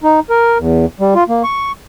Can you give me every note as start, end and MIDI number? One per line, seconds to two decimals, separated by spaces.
0.03 0.20 63
0.30 0.58 70
0.58 0.86 40
1.00 1.14 55
1.15 1.24 65
1.29 1.43 58
1.44 1.72 85